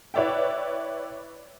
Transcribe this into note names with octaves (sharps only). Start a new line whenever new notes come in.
E4 B4 C#5 D5 E5 G5